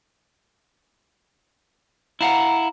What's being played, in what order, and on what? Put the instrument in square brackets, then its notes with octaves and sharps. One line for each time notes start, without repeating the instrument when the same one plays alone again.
[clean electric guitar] E4 F5 F#5 [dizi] A#5